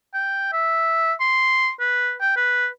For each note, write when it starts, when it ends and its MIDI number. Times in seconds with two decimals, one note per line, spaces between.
0.14 0.50 79
0.52 1.13 76
1.20 1.71 84
1.80 2.14 71
2.20 2.34 79
2.36 2.68 71